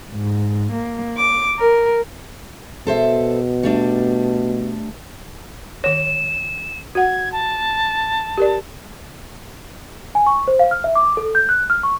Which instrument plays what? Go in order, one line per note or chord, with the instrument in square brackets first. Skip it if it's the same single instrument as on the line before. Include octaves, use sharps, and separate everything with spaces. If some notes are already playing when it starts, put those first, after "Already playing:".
[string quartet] G#2
A#3
D6
A#4
[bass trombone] B2 [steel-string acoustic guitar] A4 C5 E5
[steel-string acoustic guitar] G3 A3 D4
[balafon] D#3 C#5 [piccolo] E7
[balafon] F#4 F#5 [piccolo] G#6
[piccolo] A5
[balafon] G4 A#4 D5
[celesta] G#5
C#6
C5
F5
F6
E5
D6
A4
G6
F#6
F6
C#6